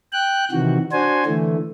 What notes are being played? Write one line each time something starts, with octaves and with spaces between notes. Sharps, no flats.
G5 F#6
C3 D#3 E3 F#4
D4 F#4 C5 G#5
D3 E3 A3